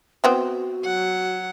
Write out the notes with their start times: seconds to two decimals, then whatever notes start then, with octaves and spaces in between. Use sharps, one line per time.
0.24 B3 C4 E4 F#4
0.85 F#3 F#5